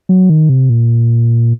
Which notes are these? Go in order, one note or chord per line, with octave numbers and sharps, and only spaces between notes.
F#3
D#3
C3
A#2